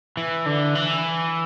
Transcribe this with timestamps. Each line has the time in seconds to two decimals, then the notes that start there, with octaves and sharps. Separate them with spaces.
0.17 E3
0.46 D3
0.75 E3